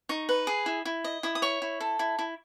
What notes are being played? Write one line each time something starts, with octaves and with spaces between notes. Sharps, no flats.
D#4 C#6
B4
G#4
E4
E4
D#5
E4 D#6
D#6
C#5 C#6
E4
A4
E4
E4